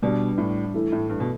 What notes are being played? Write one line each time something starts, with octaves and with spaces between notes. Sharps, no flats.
B2 G3 B3 D4
A2
E3 A3 E4
A2
G2
B2